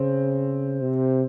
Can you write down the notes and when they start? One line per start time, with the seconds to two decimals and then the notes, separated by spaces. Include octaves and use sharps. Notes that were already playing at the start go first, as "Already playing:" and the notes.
Already playing: C#3 C4
0.81 C3